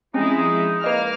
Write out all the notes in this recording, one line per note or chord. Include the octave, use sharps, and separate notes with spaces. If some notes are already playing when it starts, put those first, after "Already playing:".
F3 G#3 C4 C#4 D#4 E4
A#3 B4 D#5 F5 F6